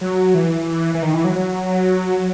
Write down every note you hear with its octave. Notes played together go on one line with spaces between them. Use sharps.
F#3
E3
E3
D#3
E3
F#3
F#3